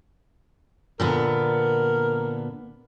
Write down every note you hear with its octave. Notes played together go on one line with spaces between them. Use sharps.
A#2 D3 B3 A#4